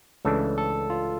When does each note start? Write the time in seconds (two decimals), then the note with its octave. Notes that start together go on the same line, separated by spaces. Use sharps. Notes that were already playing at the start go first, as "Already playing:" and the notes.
0.25 C#2 C#3 E3 A3 D4 A4
0.58 A4
0.90 F4